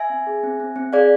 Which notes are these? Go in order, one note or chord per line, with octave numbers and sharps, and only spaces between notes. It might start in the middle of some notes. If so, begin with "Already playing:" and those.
Already playing: E5 G#5
C4
G#4
C4
C4
C4
G#4 D5 F5